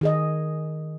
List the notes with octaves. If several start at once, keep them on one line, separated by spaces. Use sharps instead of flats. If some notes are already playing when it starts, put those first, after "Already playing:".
D#3 G#4 D#5